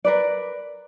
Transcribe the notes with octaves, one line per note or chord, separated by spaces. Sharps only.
A#4 B4 D5